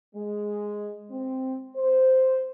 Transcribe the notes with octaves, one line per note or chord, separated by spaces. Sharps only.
G#3
C4
C5